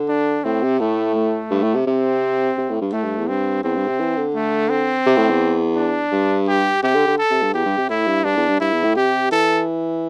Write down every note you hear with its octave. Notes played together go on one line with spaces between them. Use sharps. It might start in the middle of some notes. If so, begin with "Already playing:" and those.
Already playing: D3
D4
A2 C4
C3
A2 A3
A3
G2
A2
C3
C3 C4
C3
A2
G2
A2 A3
G2
E2
G2 C4
E2 C4
G2
C3
E3
D3
A3
C4
C3
A2
E2
D4
G2
G4
C3 G4
D3
D3
A4
C3
G2
E2 G4
G2
C3
A2 E4
G2
G2 D4
E2
G2
G2 E4
E2
A2
C3 G4
E3 A4